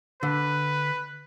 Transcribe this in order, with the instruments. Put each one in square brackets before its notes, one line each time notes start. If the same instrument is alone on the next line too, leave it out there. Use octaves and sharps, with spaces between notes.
[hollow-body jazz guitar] D3 [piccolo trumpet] B4